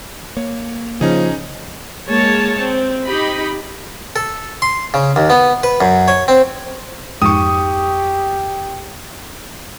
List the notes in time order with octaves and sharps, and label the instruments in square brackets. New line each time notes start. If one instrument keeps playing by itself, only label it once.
[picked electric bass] A#3 [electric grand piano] C#5
[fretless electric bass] C#3 [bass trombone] F3 [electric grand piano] C#4 D#4 G#4
[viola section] G#3 A#3 C#5 A5
C4
D#4 G4 D#5 B5
[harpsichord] A4
C6
C#3
D#2
B3
B4
F#2
C#5
C4
[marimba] F2 D#4 [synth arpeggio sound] G#2 F3 G#3 [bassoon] G4 [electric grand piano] C#6 D#6